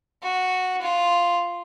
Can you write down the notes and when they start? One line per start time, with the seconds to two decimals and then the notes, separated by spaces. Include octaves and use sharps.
0.23 F#4
0.82 F4